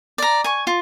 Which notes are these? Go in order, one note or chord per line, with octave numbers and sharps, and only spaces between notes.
D5 A#5
G#5 C#6
F4